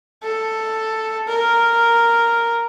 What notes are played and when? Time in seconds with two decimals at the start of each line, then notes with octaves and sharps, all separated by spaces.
0.23 A4
1.28 A#4